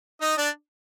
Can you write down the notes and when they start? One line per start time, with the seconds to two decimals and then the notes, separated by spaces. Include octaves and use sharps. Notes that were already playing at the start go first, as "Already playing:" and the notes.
0.21 D#4 D#5
0.37 D4 D5